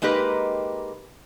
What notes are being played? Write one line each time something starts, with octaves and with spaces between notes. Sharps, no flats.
G#3 A#3 D#4 G4 B4